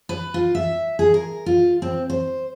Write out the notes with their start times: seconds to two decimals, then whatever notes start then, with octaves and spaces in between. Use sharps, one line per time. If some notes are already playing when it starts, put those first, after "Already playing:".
0.09 B4
0.34 F4
0.55 E5
0.99 G#4
1.14 A#4
1.46 F4
1.82 C4
2.10 C5